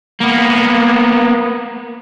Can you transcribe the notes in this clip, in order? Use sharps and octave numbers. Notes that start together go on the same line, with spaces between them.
A#3 B3